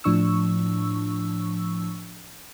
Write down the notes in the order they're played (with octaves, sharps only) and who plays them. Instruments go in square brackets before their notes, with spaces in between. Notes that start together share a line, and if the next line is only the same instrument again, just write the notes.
[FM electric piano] A2 F3 D4 C#6 E6